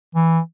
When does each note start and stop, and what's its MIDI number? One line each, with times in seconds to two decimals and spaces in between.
0.15 0.39 52